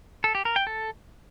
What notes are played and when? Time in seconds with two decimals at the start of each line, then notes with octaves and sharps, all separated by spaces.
0.24 A4
0.35 G4
0.45 A#4
0.56 G5
0.67 A4